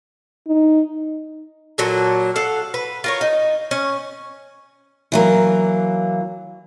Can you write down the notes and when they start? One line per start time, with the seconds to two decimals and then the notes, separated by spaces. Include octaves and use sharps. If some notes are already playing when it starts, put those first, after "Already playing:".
0.47 D#4
1.78 A#2 F#3 A4
2.36 A4 F5 F#5
2.74 B4
3.04 F4 A#4 C#5
3.21 D#4
3.71 C#4
5.12 E3 F#3 A#3